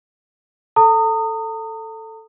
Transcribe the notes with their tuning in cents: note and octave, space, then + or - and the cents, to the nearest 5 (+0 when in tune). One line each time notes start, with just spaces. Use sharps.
A4 +0 A#5 -40 D#6 -10